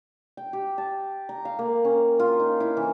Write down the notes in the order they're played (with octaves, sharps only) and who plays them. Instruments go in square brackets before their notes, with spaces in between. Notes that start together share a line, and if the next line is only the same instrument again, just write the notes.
[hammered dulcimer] G5
G4
A5
A#5
F5
A#3
C#4
F4
D#4
E4
E3